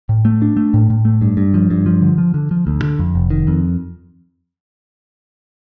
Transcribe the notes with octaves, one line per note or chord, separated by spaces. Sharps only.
A2
A3
D4
A3
A2
A2
A3
G2
G2
F3
G2
F3
D3
F3
D3
F3
D2
D3
F2
F1
D#3
F2